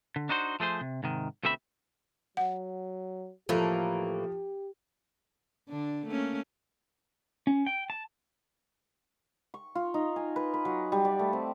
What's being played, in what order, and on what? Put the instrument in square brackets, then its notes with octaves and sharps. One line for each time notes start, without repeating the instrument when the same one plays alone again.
[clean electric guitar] D3
D4 D#4 F#4 C5
F3 A3 G#4 C5
C3
G#2 C3 D#3
D2 B2 A3 C4 E5 B5
[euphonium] F#3 [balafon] F#5
[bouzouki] A2 E3 A#3 [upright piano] F3 [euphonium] G4
[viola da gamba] D3 D4
A3 A#3 C#4
[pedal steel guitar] C#4
G5
A5
[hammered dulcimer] C#6
F4
D#4
G#5
B4
B4
F#3
G3
D5
A3
C4